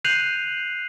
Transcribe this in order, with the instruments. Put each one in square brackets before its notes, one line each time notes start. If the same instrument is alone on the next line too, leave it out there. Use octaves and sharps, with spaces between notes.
[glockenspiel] F#6 G6 C7 D#7 F7 F#7